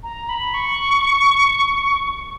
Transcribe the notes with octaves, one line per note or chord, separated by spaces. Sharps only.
A#5
B5
C#6